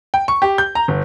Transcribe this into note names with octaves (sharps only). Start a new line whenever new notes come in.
G5
C#6
G4
G6
A#5
G1